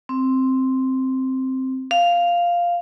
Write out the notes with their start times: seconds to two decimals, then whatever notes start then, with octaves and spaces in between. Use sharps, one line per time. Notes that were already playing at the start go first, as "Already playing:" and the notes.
0.09 C4
1.91 F5